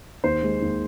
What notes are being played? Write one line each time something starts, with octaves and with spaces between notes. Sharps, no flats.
D#2 C5
G#3
D#2